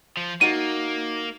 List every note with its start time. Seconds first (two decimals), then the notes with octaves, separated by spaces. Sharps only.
0.17 F3
0.41 A#3 D#4 F#4 A6 D#7